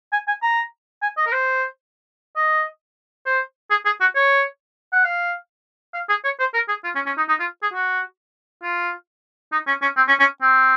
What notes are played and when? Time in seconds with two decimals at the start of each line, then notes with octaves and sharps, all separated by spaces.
0.13 G#5
0.27 G#5
0.42 A#5
1.02 G#5
1.17 D#5
1.26 A#4
1.32 C5
2.36 D#5
3.26 C5
3.71 G#4
3.85 G#4
4.01 F#4
4.16 C#5
4.93 F#5
5.04 F5
5.94 F5
6.09 G#4
6.24 C#5
6.40 C5
6.54 A#4
6.69 G#4
6.84 F4
6.95 C#4
7.06 C#4
7.17 D#4
7.29 D#4
7.40 F4
7.62 G#4
7.73 F#4
8.63 F4
9.52 D#4
9.67 C#4
9.82 C#4
9.97 C4
10.08 C#4
10.19 C#4
10.42 C4